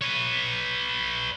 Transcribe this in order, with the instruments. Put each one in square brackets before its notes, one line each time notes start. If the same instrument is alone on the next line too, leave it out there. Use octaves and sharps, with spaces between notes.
[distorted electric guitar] B4 C#5